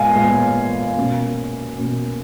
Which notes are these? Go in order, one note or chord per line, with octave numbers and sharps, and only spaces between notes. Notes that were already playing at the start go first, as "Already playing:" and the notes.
Already playing: A#2 G#3 B3 F5 G#5
A#2 G#3 B3
B2 A#3 C#4
B2 A#3 C#4